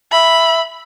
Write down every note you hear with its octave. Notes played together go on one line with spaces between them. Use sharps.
E5 B5